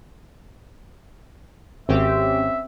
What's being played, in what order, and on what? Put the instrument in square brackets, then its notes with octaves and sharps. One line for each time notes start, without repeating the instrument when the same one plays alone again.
[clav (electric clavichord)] G#1 [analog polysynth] C4 C#4 G4 [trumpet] E5